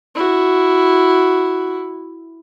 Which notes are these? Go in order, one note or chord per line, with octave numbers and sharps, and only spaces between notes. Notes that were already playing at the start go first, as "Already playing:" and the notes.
E4 F#4